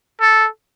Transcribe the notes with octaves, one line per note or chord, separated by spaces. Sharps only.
A4